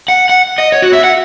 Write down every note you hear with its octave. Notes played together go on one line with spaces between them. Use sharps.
F#5
F#5
D#5
C#5
F#4
E5
F#5